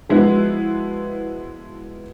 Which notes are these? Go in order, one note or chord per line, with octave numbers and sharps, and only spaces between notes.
F3 G#3 B3 E4 F#4